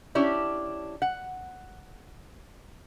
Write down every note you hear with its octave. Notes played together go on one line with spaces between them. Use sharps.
C#4 D4 E4 G4 D5
F#5